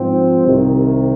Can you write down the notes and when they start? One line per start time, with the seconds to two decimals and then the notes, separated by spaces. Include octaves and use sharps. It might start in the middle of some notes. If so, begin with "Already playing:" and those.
Already playing: G#2 F3 C4
0.44 C2 C3 D#3